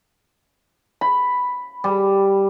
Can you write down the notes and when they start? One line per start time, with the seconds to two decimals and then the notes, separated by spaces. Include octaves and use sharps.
1.01 B5
1.84 G3